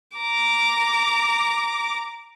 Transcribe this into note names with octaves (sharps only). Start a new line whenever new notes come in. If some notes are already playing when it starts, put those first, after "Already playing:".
A#5 D6